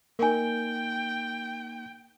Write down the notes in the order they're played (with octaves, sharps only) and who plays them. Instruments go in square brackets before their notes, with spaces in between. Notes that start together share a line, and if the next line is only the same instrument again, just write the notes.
[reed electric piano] A#3 D#4 [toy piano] A#4 G#5 [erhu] G5